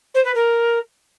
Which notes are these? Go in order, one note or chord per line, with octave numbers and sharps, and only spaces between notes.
C5
B4
A#4